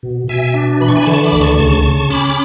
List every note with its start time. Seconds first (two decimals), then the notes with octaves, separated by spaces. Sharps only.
0.03 B2
0.28 B2 E5 G#5
0.54 D4
0.81 E3 B5
0.88 C#6
0.95 G#5 B5
1.06 D3 A5 C#6
1.23 B5 D6
1.32 D2
1.41 A5 C#6
1.58 C#3 A5 C#6
1.84 C#3
2.10 C#4 B5 D6